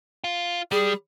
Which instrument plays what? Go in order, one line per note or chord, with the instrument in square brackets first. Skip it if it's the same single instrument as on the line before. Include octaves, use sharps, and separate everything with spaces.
[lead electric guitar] F4
[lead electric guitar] G3 [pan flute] G#4